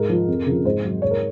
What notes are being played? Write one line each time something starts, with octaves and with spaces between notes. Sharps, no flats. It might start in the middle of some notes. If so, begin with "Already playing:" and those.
Already playing: G#2 A#4
F3
F2
C#3 F3
G#2 C5
F#3
G#2 C#5
A#4